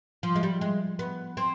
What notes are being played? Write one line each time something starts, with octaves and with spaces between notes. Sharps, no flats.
F3
G#3
G3
G#3
B3
C4